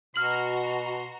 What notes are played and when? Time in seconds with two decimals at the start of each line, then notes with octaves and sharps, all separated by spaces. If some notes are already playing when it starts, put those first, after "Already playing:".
0.16 B2 F#4 A#5 C6 F6 F#7